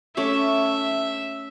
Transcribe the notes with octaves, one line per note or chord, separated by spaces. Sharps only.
A3 C#4 E5 D6